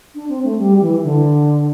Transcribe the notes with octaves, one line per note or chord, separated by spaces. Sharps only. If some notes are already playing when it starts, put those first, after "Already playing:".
D4
C4
A3
G3
E3
D3